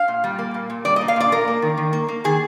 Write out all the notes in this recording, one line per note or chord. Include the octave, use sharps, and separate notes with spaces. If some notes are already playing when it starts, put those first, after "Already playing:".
Already playing: F5
A#2
G3
A#3
A#2
A#2
G3 D5
D#5
A#3
F5
A#2 D5
A#3 A#4
A#3
D#3
D#3
A#3
A#3
D#3 G#4